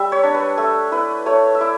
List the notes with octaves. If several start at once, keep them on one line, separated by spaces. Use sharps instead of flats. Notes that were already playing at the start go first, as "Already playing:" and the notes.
Already playing: G3 E5
C#5
D4
B4
A3 A4
E4 B4
A3 C#5
E5
E4 D5